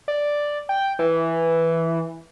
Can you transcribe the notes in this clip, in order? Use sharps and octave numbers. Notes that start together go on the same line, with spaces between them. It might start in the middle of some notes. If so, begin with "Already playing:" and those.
D5
G5
E3